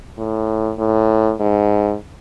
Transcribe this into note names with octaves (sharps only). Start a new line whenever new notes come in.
A2
A2
G#2